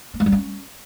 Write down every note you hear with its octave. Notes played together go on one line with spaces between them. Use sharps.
A#3
G#3
G3
C#4